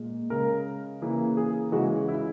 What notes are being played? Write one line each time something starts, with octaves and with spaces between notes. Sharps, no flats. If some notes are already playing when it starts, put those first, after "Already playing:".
Already playing: A#2 G#3
C#3 G#3 A#4
C#3 E3 A#3
G#4
C#3 E3 G#3 F#4
E4